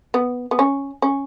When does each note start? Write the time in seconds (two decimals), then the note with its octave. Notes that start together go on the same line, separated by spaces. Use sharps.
0.14 B3
0.51 B3
0.59 C#4
1.02 C#4